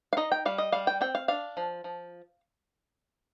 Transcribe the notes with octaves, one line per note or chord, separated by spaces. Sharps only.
F5
D#4 D#5
G5
G3 F5
D#5
G3 F5
G5
C4 G5
F5
D4 F5
F3
F3